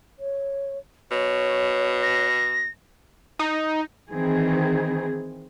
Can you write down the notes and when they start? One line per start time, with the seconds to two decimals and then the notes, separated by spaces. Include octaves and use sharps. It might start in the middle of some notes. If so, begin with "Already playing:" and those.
0.19 C#5
1.12 B2 C#5
2.03 A#6
3.39 D#4
4.12 D#3 E3 C4 G#4